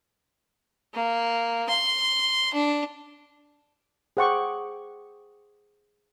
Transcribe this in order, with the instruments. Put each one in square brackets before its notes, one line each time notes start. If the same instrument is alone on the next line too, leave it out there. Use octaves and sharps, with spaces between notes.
[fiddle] A#3
C6
D4
[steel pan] G#4 C5 F#5 G5 C#6 D6